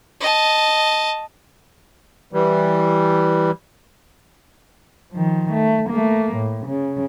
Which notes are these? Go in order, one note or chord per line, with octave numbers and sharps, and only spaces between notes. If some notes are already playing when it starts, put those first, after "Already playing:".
D#5 A5
E3 G3
D#3 F3
A3
A3 A#3
A2
C#3